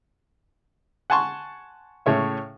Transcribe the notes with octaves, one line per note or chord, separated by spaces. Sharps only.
F#5 G#5 A5 C6 C#6
A2 C#3 C#5 E5